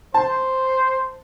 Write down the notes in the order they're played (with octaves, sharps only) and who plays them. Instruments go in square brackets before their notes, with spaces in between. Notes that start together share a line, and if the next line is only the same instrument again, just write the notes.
[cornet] C5 [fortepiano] A5